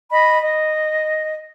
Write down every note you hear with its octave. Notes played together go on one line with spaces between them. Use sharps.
D#5 B5
D#5